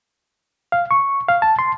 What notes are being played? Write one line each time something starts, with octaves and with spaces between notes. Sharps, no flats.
F5
C#6
F5
A5
C6